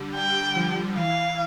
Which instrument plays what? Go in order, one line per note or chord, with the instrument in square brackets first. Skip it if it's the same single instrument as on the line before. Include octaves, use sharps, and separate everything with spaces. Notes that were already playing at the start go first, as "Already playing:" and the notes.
Already playing: [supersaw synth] D3 G3
[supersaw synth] G3 [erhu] G5
[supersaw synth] F3
[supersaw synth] E3 [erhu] F5